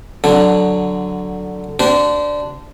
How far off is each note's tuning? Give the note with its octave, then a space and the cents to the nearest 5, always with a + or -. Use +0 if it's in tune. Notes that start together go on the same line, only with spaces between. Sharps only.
D3 +0 F#3 +0 D4 +0
D4 +0 G4 -35 C5 -25